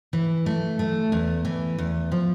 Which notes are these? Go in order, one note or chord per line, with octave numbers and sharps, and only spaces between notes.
E3
A3
A3
E2
E3
E2
F3